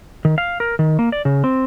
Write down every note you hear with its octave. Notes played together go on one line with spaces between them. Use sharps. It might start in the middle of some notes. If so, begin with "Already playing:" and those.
D#3
F5
A#4
D#3
A#3
D5
C#3
C4